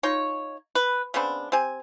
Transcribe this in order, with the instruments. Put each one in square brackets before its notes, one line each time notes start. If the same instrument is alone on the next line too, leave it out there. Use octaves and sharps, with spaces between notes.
[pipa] D#4 F4 C#5
B4
C#3 B3 C4 D4
C4 G4 G#5